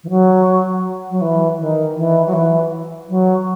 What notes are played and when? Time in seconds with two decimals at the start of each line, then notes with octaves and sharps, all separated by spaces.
0.04 E3
0.09 F#3
1.10 F#3
1.21 E3
1.59 D#3
1.96 E3
2.26 F#3
2.33 E3
3.08 F#3